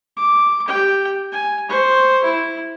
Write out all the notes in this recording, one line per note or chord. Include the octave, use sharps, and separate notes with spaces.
D6
G4 G5
G#5
C5 C#6
E4